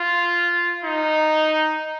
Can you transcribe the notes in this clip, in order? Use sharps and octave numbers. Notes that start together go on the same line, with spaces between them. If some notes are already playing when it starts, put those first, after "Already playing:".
Already playing: F4
D#4